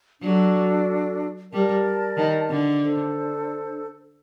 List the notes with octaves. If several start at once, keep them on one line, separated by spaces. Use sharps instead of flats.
F#3 D4 F#4 A4
G3 A#4 D5 A5
D#3
D3
D4 A4 C5